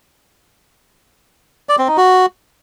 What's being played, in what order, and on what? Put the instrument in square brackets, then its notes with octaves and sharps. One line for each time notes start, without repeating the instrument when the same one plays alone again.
[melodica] D5
C4
D#4
F#4